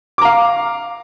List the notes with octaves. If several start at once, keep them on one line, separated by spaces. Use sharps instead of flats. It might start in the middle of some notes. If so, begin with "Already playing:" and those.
F5 A#5 D6